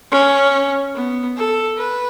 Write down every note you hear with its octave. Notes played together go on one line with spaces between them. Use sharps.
C#4
B3
A4
B4